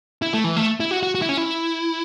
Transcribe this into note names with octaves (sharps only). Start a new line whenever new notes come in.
E4
A3
E3
A3
E4
F#4
F#4
F#4
E4
C#4
E4